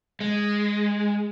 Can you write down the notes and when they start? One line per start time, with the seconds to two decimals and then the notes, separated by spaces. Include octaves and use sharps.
0.21 G#3